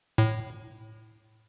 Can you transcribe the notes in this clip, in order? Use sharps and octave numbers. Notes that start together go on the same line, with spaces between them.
A2